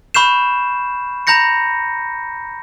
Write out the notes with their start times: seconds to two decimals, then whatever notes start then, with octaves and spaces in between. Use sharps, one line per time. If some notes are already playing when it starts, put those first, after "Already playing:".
0.15 B5 C#6 F6 G6 C7 E7
1.27 A#5 B5 G6 A#6 C#7